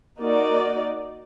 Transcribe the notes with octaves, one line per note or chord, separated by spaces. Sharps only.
A#3 D#4 F#4 A#4 D5